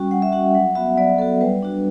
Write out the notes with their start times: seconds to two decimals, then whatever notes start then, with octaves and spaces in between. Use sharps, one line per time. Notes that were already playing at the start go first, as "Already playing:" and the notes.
Already playing: G3 C#4 F#4 G5
0.11 G3 F#5
0.22 E5
0.32 C#4 F#4 F#5
0.54 F#3 F#5
0.75 B3 F#4 E5
0.98 F#3 D5
1.18 B3 F#4 A4
1.41 G3 B4
1.63 D4 F#4